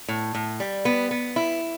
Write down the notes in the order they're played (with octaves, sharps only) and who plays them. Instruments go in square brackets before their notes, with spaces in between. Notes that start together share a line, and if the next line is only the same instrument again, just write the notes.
[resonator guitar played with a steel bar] A2
A2
G3
B3
B3
E4